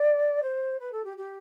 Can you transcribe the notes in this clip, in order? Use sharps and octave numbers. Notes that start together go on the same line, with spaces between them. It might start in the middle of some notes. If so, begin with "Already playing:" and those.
Already playing: D5
C5
B4
A4
G4
G4